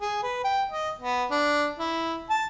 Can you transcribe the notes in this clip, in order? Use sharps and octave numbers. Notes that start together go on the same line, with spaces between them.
G#4
B4
G5
D#5
B3
D4
E4
A5